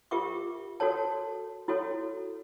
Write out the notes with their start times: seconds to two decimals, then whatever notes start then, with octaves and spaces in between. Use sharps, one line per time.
0.11 F4 G4 A#4 E5 C#6 D6
0.80 F#4 A4 A#4 C#5 A5
1.68 E4 F#4 A4 C#5